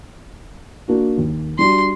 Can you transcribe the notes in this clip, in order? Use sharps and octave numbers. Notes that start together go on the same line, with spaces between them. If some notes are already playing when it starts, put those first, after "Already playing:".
A#3 D4 F#4
D#2
G3 D4 F#4 C6